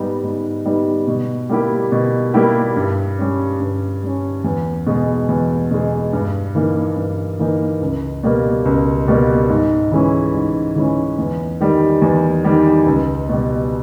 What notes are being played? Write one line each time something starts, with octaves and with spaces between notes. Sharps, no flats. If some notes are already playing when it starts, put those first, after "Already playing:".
Already playing: G#2 G3 B3 D#4
G#2
G3 B3 D#4
B2
G3 A#3 E4 G4
B2
G3 A#3 E4 G4
G2
G3 C#4
G2
G3 C#4
E2
B2 G#3
E2
B2 G#3
G2
E3 A#3 D#4
G2
E3 A#3 D#4
C#2
B2 G3 A#3
C#2
B2 G3 A#3
G#2
E3 G#3 C#4 E4
G#2
E3 G#3 C#4 E4
E2
D#3 G3
E2
D#3 G3
C#2
B2 G3